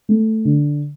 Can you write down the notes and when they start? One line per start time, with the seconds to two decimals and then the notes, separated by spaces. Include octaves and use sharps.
0.09 A3
0.45 D3